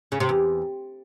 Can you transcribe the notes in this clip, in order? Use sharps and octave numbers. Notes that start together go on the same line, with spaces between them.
C#3
C3
E2